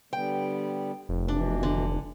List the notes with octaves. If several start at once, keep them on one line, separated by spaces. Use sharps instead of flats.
D3 G3 B3 G5
F1
B2 E3 D4
D3